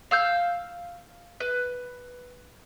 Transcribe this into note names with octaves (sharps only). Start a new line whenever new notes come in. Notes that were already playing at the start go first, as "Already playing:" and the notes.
F5 E6 G6
B4